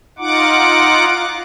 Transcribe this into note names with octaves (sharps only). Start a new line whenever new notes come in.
D#4 F4 F#5 D6